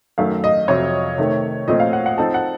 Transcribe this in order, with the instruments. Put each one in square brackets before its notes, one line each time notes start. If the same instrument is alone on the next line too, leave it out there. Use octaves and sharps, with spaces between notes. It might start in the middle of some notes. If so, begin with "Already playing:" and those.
[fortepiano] F#2 D#3 A3 [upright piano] F5
[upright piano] D#5
[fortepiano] F2 C3 F#3 C4 [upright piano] C#5
[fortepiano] C3 D#3 A3
[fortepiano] A#2 F3 A3 C4 [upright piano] D#5
[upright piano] F5
F#5
F#5
[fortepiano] F3 C4 D#4 A4 [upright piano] A5
[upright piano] F#5